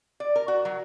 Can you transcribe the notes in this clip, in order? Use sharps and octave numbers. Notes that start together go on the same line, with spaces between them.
D5
A#4
F#4
F#3